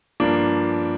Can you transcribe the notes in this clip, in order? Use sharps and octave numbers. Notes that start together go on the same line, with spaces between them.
G2 F3 A#3 D4